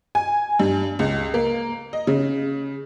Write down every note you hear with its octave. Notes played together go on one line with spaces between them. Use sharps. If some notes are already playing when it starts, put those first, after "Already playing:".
G#5
G2
C#2
A#3
D#5
C#3